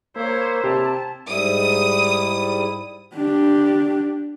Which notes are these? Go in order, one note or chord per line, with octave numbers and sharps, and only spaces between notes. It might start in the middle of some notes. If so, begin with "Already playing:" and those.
A#3 E4 C5 C#5
C3 G4 A5
G#2 G3 E4 D#6
D4 G4